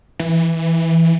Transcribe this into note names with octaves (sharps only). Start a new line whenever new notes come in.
E3